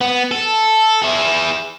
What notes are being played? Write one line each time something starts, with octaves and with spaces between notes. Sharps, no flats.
B3
A4
E4 G#4